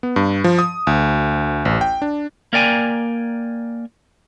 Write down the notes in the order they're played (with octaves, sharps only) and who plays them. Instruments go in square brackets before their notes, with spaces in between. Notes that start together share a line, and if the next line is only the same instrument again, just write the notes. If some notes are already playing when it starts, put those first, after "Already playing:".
[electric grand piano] B3
G2
F3
D#6
D2
A1
G5
D4
[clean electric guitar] A#3 A#4 D5 G5 G#5